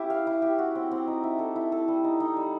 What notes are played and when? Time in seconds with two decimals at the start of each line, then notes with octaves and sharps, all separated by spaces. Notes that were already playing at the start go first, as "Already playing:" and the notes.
Already playing: C#4 E4 G4
0.10 F5
0.27 E4
0.42 G4
0.59 F#4
0.75 C4
0.91 C4
1.07 D#4
1.24 E4
1.39 A4
1.56 E4
1.72 A4
1.88 G3
2.04 D#4
2.20 D#4
2.37 G3